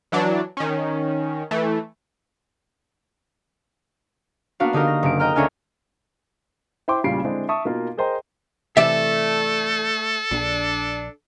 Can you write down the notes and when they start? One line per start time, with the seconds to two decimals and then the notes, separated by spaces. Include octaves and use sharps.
0.12 E3 F#3 D4
0.57 D#3 C#4
1.51 E3 A3
4.60 A#3 B3 D4 F#4 F5
4.73 D3 D#4 G4 A#4
4.87 A#6
5.03 F#1 D7
5.20 D#5 G5 A#5 F6
5.35 D2 C#4 D4 G#5 F6
6.88 E4 C5 G5 C6 D6
7.04 A1 A#2 C#3 G3 C7 D7
7.24 D3 G#3 C4 D4 E4
7.49 E5 A5 C#6 D#6
7.65 B2 A#3 D#4 F4 A#4
7.97 G#4 A#4 C5 D#5 G5 A#5
8.77 C3 E3 A3 A4 D5 E5
10.31 A#1 D4